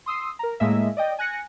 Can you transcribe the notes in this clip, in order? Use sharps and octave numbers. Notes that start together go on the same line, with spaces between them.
C6 D#6 E6 C7
A#4 A#5
A2 G#3 A#3 D#5 E5
D5 D#5 G5
G#5 F#6 A#6 C#7